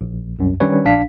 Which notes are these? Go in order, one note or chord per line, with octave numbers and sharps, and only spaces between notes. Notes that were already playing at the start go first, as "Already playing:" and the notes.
A#1
C2 F#2
D#3 G3 C#4 D4 B4 C#5
A#1 D4 F5 B6